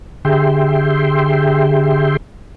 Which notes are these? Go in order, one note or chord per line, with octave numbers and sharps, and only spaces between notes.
D3 G4 G#4 E5 G5 C6